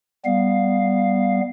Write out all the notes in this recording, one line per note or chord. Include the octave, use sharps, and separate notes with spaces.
G3 B3 F5